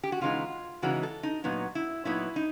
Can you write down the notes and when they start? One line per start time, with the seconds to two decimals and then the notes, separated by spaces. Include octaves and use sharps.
0.04 G4
0.12 F#4
0.21 C#3 E3 G#3 B3 D#4 F4
0.82 C#3 E3 G#3 B3 D#4 F#4
1.03 A4
1.23 D#4
1.44 A#2 F#3 B3 D#4
1.75 E4
2.05 A#2 F#3 B3 D#4 E4
2.36 D#4